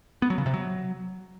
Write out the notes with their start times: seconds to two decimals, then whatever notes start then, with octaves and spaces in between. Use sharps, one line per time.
0.22 B3
0.30 F#3
0.38 C#3
0.46 C3
0.54 F#3